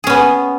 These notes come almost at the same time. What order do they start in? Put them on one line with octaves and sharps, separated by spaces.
G#4 C#4 B3